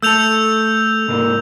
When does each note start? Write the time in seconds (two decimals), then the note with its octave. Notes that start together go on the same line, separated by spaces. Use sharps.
0.02 A3 A4 E6 G6 F7
1.08 C2 G#2 A#3